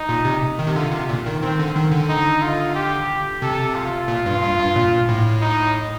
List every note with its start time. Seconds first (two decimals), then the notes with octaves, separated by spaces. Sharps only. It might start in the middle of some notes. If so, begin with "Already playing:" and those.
Already playing: D#4
0.09 A#2
0.25 C3
0.59 D#3
0.67 C3
0.75 D3 F4
0.92 C3
1.09 A#2
1.26 D#3
1.42 D#3 C4
1.59 D3
1.76 D#3
1.91 D3
2.09 D#4
2.42 F4
2.75 G4
3.42 C3 A4
3.75 F4
4.08 A#2
4.26 G2
4.42 G2
4.58 G2
4.76 A#2
5.09 A2
5.41 D#4